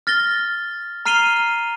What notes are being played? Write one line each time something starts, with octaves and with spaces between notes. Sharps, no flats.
F6 A6 A#6 G7
A#5 F6 C7 D#7 F7 G7